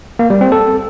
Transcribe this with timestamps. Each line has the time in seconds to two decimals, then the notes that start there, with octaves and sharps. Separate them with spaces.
0.19 A#3
0.30 G3
0.41 C4
0.52 A4